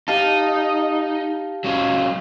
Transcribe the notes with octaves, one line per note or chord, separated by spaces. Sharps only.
D#4 G4 F5 A5
F#3 C#4 F4